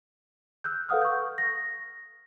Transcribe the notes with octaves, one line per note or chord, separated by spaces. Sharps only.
E6 F#6 G6
A4 B4 F5 F#5 D#6 F6
C#6 G6
A#6